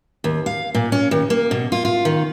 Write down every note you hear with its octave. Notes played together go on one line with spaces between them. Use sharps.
D#2
F5
A#2
C#4
D#2
A#3
B2
F4
F4
D#3